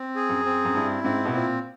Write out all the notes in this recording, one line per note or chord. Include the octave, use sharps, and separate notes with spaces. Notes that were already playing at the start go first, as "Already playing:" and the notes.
Already playing: C4
G#4
F#2
C4
F#2
G2 E4
G#2 C4
B2
A#2 C4